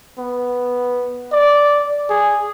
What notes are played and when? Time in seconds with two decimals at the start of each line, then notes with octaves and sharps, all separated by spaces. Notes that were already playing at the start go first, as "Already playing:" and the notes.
0.18 B3
1.32 D5
2.10 G#4